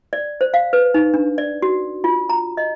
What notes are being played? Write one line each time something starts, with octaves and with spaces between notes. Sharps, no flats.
D5
C5
F5
B4
D#4
D4
D5
F#4
F4
A#5
D#5